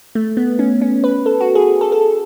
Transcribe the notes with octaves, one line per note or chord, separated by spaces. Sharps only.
A3
B3
C#4
C#4
B4
A4
F#4
G#4
A4
A4